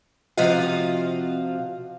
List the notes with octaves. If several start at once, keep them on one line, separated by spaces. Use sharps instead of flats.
C3 F3 F4 F#4 D#5 F5